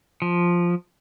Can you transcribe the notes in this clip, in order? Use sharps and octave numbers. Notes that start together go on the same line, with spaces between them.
F3